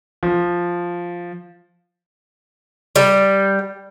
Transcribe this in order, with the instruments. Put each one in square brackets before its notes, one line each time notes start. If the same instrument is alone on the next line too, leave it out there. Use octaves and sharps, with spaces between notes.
[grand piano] F3
[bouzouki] G3